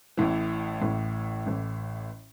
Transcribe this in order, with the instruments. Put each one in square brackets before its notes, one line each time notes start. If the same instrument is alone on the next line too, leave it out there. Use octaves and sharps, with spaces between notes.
[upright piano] A1 A2 E3
A1 A2 E3
A1 A2 E3